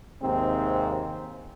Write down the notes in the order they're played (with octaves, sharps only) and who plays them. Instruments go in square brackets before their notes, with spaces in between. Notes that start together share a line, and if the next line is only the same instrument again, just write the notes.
[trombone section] D#2 G#2 C3 C4